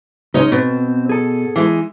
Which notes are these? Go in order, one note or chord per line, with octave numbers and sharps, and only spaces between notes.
C#2 G#3 C#4 D#4 C#5 D#5
B2 C4
G#4 A4
E3 G#3